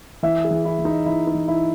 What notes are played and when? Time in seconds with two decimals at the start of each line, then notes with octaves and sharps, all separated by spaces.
0.23 E3 E5
0.45 G#4
0.51 E3
0.65 E4
0.79 E3
0.85 D#4
1.06 E3 E4
1.27 D#4
1.35 E3
1.48 E4